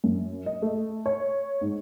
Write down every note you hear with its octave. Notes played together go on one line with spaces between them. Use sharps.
F#2
D#5
A3
C#5
G#2